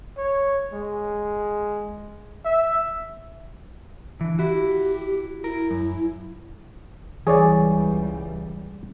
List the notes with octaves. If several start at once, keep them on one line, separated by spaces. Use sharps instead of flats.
C#5
G#3
E5
D3 E3
E4 F#4 G4
E4 A#4
F#2
C#2 E3 G3 G#4 C#5 D5